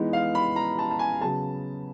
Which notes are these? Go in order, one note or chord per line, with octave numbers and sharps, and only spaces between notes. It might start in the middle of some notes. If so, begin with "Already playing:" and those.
Already playing: E3 G#3 B3 D#4
F5
B5
A#5
A5
A5
G#5
C#3 F#3 B3 A5